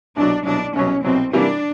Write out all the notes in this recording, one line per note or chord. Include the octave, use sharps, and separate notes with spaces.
C2 B2 F#3 D4
C2 B2 F#3 D4
C2 B2 F#3 C#4
C2 B2 F#3 C4
C3 E3 G3 A#3 D4